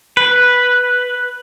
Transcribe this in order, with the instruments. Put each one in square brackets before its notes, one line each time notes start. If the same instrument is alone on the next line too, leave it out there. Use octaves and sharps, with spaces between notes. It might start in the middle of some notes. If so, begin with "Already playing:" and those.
[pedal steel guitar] B4